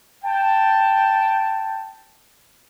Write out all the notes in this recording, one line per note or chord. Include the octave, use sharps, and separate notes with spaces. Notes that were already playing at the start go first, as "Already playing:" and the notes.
G5 A5